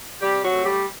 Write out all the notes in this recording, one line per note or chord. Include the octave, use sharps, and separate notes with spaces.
C3 G3 G4
F#3 F#4
A3
G3 G4